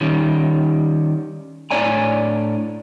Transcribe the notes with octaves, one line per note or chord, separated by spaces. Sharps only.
D#3 G3 C#4
A2 D4 C#5 D5 G#5 A#5